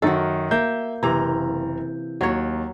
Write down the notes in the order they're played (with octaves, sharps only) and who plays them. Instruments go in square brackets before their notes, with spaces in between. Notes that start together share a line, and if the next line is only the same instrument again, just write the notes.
[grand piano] F#2 D#3 [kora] F#4 A4
[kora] A#3 [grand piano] E5 G6
[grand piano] F#1 A#5 [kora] C3 E3
[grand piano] D#2 [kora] F#3 C#5